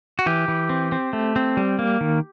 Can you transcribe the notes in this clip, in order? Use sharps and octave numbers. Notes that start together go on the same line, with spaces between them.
F#4
E3 G4
E3
C4
C4
A3
C4
G3
A#3
D#3